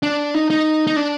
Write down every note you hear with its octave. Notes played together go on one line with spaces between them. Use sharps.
D4
D#4
D#4
D#4
D4